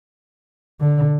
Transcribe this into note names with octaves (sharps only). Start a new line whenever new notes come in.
D3